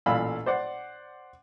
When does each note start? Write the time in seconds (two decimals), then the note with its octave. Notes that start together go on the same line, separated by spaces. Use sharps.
0.06 A1 A#2 F5 B5 E6
0.46 C5 D5 F#5